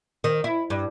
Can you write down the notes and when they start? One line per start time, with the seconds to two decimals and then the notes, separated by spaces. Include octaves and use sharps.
0.24 D#3
0.44 E4
0.70 G2